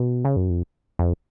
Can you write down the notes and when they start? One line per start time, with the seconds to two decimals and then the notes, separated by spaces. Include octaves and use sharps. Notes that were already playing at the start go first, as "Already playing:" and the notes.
Already playing: B2
0.25 C#3
0.36 F#2
0.50 F2
0.99 F2